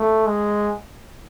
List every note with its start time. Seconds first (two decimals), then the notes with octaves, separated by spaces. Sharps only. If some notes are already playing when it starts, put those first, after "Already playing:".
Already playing: A3
0.27 G#3